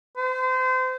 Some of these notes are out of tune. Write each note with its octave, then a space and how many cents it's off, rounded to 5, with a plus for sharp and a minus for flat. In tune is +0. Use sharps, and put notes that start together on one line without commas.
C5 -30